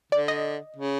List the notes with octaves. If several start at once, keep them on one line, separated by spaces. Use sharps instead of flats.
D3 D5
D#5
C#3